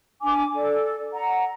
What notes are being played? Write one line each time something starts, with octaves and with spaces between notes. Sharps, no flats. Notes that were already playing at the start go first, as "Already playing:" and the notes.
D4 G#5 D6
A4 D5
F#5 A#5